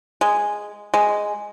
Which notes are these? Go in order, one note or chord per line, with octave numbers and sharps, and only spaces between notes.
G#3
G#3